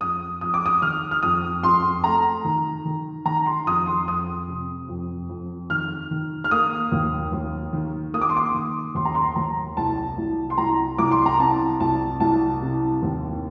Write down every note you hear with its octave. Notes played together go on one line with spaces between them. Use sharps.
F2 D#6
F2 D#6
D6
D#6
D#3 F6
F6
F2 D#6
F2 C6
A3 A#5
D#3
D#3
D#3 A#5
C6
F2 D#6
C6
F2 D#6
C3
F2
F2
D#3 F6
D#3
F6
A#3 D#6
D#2
D#2
D#3
A#3 D#6
D6
C6
D6
D#3
D#2 C6
A#5
C6
D#2 A#5
C2 A5
C2
C6
C2 A#5
C2 D6
C6
A#5
C3 A5
C2 A5
C2 A5
C3
D#2